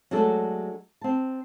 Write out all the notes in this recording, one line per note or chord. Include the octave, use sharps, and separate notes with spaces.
F#3 G#3 A3 D4 F#4 A4
C4 A5